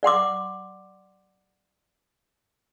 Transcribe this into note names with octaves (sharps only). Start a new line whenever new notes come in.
D5 F#5 C6 D6